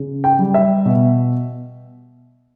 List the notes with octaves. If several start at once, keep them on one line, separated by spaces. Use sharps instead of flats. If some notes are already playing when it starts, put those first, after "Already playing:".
Already playing: C#3
G5
G3
E5
B2